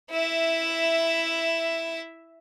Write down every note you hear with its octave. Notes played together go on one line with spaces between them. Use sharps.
E4 E5